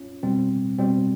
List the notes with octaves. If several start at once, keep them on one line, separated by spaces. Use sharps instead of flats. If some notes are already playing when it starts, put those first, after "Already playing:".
Already playing: C#4 F4
B2 G3 C4
B2 G3 C4